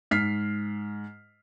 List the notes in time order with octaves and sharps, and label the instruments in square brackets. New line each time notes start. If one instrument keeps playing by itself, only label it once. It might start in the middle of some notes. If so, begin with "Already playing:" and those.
[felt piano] G#2 F6 B6 C7